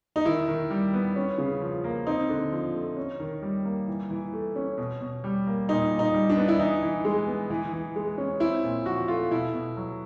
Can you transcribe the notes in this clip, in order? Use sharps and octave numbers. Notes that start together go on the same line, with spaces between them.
D#4
D#3 E4
D#3
G3
B3
C#4
C#3
F3
A#3
C4 D#4
D3
F3
A3
C#4
D#3
G3
A#3
E3
E3
A3
C#4
B2
B2
G3
A#3
A#2 D#4
A#2
D#4
G3
D4
B3
E4
E3 D#4
E3
G#3
B3
E3
E3
G#3
C#4
C4 E4
A#2
F3 F#4
A3 F4
B2 E4
B2
F#3